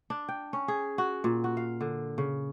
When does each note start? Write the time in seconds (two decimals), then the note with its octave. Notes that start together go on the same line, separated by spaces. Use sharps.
0.10 D4
0.29 G5
0.53 C#4
0.68 G#4
0.98 F#4
1.24 A#2
1.44 F#4
1.57 F5
1.81 D3
2.18 C#3